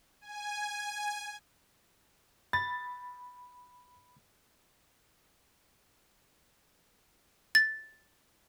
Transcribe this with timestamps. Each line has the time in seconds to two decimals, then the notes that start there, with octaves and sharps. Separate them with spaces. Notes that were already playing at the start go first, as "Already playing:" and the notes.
0.21 G#5
2.53 B5 A6
7.55 A6